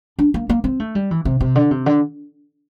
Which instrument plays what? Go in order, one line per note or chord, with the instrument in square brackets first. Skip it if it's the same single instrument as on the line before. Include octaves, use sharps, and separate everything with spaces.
[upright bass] D4
A#3
A#3
C4
A3
G3
E3
C3
C3
D3
C3
D3